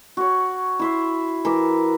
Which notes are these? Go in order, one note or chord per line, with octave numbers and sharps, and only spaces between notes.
F#4 C#5
E4 E5 C6
E3 A#4 E5 D6